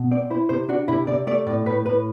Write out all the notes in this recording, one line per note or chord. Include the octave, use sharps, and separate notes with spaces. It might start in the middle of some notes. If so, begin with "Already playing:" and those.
Already playing: B2
C4 D5
E4 C5
C3 C5
D4 F#4
C3 E4
C3 D5
A3 D5
A2 D5
A2 B4
A2 B4